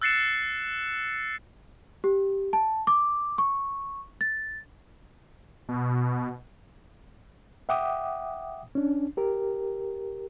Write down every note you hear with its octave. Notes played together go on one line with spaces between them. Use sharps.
E6 F#6 A6 C7 C#7 E7
G4
A5
D6
C#6
A6
B2
E5 F#5 G5 D6 D#6
C#4 D4
G4 A#4